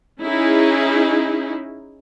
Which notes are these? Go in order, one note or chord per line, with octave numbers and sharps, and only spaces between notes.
C#4 D#4 E4 G#4